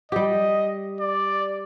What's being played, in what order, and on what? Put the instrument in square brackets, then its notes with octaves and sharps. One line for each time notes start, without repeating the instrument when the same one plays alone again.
[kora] G3 G4 [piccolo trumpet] D#5
[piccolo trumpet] D5